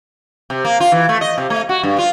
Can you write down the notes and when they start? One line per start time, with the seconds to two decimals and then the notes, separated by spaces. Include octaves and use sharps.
0.50 C3
0.65 A#3
0.80 F4
0.92 E3
1.09 A3
1.21 D#5
1.38 C3
1.50 A3
1.69 F#4
1.83 G2
1.98 F4